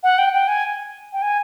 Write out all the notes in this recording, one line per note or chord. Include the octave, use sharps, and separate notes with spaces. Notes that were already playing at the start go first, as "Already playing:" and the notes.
F#5
G5
G5
G#5
G5
G#5